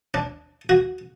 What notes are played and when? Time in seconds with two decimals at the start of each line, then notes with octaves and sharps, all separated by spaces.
0.14 D4
0.69 F#4